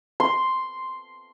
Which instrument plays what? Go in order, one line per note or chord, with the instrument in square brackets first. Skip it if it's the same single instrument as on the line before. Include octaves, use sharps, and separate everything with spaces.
[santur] C6